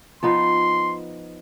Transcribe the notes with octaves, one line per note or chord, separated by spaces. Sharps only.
F3 B3 D#4 C6